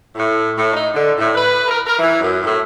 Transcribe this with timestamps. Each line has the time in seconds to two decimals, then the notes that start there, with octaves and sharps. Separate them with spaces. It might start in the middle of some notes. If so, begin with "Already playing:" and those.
0.15 A2
0.56 A2
0.73 D#4
0.94 D3
1.17 A2
1.34 B4
1.67 A#4
1.85 A#4
1.99 E3
2.20 F#2
2.43 A2